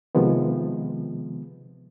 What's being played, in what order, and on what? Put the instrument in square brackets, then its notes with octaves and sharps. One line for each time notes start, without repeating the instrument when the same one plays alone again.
[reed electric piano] C3 D#3 F3 G#3 B3